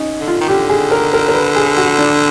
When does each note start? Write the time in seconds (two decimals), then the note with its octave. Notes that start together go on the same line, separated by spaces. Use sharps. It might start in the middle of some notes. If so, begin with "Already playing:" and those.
Already playing: C#4 D#4
0.21 D3
0.27 F4
0.41 D#3
0.48 D3 G4
0.69 G#4
0.91 A#4
1.13 A#4
1.28 A#4
1.34 B4
1.56 G#4
1.77 F#4
1.98 D4